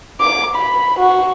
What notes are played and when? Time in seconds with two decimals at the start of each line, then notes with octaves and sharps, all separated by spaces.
0.21 D6
0.56 B5
0.99 F#4